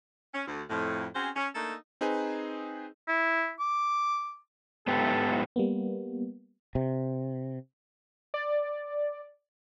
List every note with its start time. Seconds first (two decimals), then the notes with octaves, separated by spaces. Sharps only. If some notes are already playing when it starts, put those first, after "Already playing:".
0.34 C#4
0.47 D2
0.70 F2 A2
1.15 C4 C#4 F#4 G#4 C5
1.36 C#4
1.55 A3 A#3 D4 D#4 A4
2.01 C4 D#4 G#4 B4 C5 G#5
3.08 E4
3.60 D6
4.87 G#2 B3 G4 A4
5.56 G3 A#3 B3
6.75 C3
8.34 D5